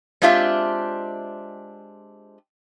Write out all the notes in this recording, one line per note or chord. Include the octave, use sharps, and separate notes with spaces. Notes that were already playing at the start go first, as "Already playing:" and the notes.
G#3 C4 D4 F4 G4 E5